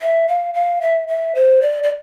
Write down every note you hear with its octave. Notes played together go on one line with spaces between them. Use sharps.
E5
F5
F5
E5
E5
C5
D5
D5